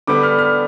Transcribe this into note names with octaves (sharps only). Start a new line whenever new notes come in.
D3 G3 B3 D6
F6
F6